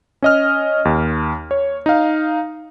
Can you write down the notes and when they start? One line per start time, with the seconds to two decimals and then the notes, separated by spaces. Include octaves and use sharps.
0.22 C#4 D#5 F6
0.85 D#2
1.51 C#5
1.86 D#4 F5